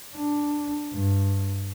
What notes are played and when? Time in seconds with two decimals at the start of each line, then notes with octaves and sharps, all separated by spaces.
0.15 D4
0.94 G2